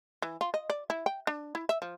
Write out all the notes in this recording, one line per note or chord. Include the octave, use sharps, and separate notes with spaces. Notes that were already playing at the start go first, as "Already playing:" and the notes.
E3
F4
D#5
D5
E4
G5
D4
E4
E5
F3